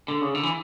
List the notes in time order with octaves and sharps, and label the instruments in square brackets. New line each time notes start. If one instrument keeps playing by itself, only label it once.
[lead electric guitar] D3
C#3
D3
E3